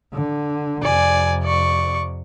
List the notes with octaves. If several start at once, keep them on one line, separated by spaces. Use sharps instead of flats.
D3
F2 C3 D5 G#5
D5 C#6